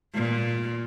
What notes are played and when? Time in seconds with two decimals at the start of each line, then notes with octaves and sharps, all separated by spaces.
0.14 A#2